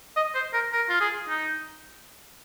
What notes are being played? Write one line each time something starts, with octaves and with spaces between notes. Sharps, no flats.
D#5
C5
A#4
A#4
F4
G#4
D#4